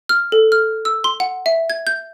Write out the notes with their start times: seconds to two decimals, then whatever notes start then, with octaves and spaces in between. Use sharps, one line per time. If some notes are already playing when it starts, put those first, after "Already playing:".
0.09 F6
0.32 A4
0.52 F6
0.85 E6
1.04 C6
1.20 F#5
1.46 E5
1.70 G#6
1.87 G6